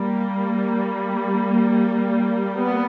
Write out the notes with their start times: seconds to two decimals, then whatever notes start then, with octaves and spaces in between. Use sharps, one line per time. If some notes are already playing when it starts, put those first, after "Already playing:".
Already playing: G3 A#3
2.58 B3